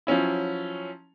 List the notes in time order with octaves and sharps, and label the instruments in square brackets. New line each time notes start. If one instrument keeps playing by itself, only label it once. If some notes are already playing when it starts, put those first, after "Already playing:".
[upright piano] F3 F#3 C#4 E4